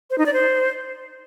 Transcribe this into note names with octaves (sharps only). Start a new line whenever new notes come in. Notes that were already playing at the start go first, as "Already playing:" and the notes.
C5
D#4
D5
C5